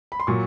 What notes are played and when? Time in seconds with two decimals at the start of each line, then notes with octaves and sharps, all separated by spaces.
0.12 B5
0.20 C6
0.27 A#2 F#3 C#6